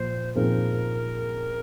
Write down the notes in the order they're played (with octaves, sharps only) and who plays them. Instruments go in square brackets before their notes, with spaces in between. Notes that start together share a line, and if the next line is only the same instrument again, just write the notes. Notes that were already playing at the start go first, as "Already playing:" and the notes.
Already playing: [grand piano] A#2 F3 [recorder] C5
[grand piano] A#2 F3 C4 D#4 G#4 [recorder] A#4